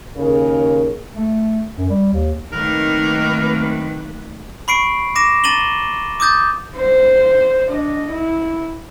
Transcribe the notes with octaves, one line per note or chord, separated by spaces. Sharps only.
D#2 C#3 G#4 A#4
A3
F#2
G3
D#2
D#3 F#3 A3 A#3 C4 A#4 B4
B5 C#6 C7 D7
D6 A#6 E7
A#5 A6 D#7 E7 F#7 G7
D6 D#6 G6 A6
C5
D4 D#5
E4